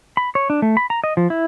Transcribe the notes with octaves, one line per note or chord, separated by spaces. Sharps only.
B5
C#5
D4
A3
B5
A#5
D#5
F3
E4